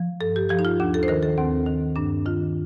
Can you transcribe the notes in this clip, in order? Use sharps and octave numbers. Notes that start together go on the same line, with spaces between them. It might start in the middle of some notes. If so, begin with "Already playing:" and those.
Already playing: F3
G2 A4
G4
F3 G4
D#4
F4
D#2 D4
A4
C5
D#3 A#4
A4
D#2 C4
D#3
G2 D4
D#3 F4